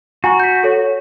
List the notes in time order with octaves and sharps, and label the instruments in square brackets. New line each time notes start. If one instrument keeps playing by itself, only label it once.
[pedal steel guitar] F#4 [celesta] G#5 A#5 C#6
[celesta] G6 B6
A4 C#5